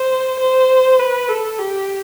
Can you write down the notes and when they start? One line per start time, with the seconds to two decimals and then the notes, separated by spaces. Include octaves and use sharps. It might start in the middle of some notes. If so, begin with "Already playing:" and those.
Already playing: C5
0.40 C5
0.99 B4
1.29 A4
1.59 G4